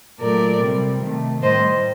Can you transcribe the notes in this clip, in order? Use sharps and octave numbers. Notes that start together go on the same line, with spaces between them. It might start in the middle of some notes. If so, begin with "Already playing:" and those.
A#2 F#3 A3 A#4 D5
C3 G3
C3 D#3 A3
A2 G3 C5 D#5